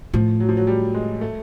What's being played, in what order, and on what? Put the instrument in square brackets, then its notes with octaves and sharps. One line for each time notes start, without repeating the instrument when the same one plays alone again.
[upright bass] A2 [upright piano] F3
[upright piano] F#3
F3
F#3
G3
G#3
A3